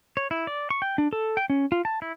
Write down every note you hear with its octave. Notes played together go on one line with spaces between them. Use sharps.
C#5
E4
D5
C#6
G5
D4
A4
G5
C#4
F4
A5
E4